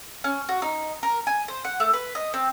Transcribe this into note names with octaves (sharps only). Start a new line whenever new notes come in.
C#4
F#4
D#4
A#4
G#5
C5
F#5
A3
B4
D#5
C4